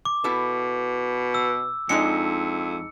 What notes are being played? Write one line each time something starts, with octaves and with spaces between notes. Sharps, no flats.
D6
B2 E4 A4
E6
F2 G#3 D4 D#4 C#7